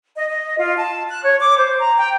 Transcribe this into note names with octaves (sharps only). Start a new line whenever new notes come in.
D#5
D#5
F4
A5
F#6
C#5
D6
C5
A#5
G5